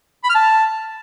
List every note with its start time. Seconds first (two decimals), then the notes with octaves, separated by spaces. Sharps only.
0.24 B5
0.30 F6
0.35 A5